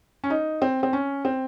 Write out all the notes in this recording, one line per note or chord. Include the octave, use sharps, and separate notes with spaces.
C#4
D#4
C4
C4
C#4
C4